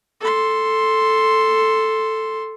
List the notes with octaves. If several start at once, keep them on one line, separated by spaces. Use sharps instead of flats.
A4 C6